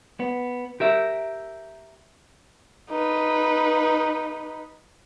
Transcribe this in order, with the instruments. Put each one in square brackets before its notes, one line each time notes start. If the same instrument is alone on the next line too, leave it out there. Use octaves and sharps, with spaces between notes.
[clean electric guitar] B3
G4 A#4 E5
[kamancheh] D#4 B4